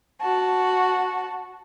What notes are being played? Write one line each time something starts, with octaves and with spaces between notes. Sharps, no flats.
F#4 A5